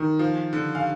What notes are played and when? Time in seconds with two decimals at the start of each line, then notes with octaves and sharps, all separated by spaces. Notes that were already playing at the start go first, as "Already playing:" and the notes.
Already playing: D#3
0.19 F3
0.53 D3
0.75 F5